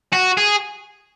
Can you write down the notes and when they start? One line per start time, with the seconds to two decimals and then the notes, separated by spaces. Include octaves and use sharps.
0.13 F#4
0.38 G#4